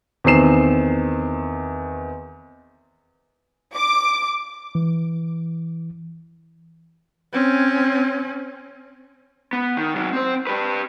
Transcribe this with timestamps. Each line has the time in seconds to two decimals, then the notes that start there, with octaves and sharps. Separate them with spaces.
0.24 E2 D#3 C4 C7 E7
3.74 D6
4.75 E3
7.32 C4 C#4
9.53 B3
9.77 D#3
9.95 C3 F#3
10.13 C4 C5
10.47 G4 B4